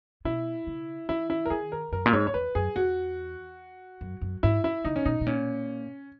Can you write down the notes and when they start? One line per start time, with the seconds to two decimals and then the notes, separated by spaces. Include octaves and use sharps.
0.25 B2 E4
0.67 C#3
1.09 D#3 E4
1.30 E4
1.46 A#4
1.50 D#3 G#4
1.72 A#4
1.92 F#2 A#4
2.06 A#2
2.13 G#2 C#5
2.27 C#5
2.34 E2 B4
2.55 F#2 G#4
2.76 E2 F#4
4.01 F#2
4.21 F#2
4.43 G#2 E4
4.64 E4
4.85 C#3 D#4
4.96 C#4
5.05 B2 D#4
5.21 B2
5.26 A#2 C#4